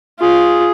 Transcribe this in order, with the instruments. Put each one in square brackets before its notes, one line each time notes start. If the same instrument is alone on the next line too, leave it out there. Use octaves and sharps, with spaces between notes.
[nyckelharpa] F4 [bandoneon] G#4